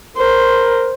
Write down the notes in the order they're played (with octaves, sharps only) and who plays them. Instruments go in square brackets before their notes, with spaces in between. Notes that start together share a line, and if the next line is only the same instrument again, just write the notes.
[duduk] A#4 [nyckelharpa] C5